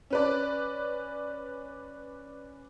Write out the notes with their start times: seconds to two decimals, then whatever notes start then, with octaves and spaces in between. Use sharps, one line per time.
0.10 C#4 B4 D5